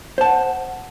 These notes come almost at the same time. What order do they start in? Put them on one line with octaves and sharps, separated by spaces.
C5 A5 F#5